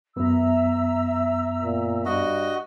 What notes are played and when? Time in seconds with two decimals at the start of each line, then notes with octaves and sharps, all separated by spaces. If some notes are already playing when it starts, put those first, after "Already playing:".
0.16 F#2 B3 E5 A#5 E6
1.61 A#2
2.06 G2 F#4 D#5